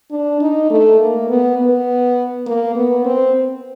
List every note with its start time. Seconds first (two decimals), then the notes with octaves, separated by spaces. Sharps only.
0.11 D4
0.41 D#4
0.71 A3
1.00 A#3
1.29 B3
1.58 B3
2.46 A#3
2.76 B3
3.05 C4